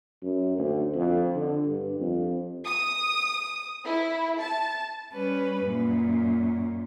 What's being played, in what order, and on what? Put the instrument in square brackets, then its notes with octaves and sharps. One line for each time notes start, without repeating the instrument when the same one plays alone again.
[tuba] F#2
D2
F2
D3
G2
F2
[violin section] D#6
E4
A5
[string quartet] G3 C#4 B4
F#2 A#2